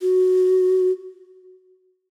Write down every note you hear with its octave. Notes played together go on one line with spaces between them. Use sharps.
F#4